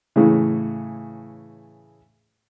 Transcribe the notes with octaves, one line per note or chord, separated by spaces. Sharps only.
A2 C#3 E3